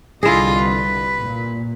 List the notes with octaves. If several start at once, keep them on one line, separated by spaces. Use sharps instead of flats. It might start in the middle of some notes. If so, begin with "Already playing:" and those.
C2 D3 G3 E4 F4 G#4 D#5
B4
A#2